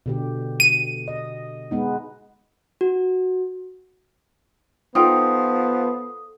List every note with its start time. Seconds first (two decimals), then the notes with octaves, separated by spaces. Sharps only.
0.06 B2 D3 G4
0.60 D#7
1.08 D#5
1.71 G#3 B3 D#4
2.81 F#4
4.95 F3 B3 D#4 F4 A4 G5 D#6